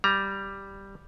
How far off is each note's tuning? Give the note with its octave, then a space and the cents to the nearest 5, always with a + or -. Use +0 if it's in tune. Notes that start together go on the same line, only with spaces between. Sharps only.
G3 +0 A#5 +15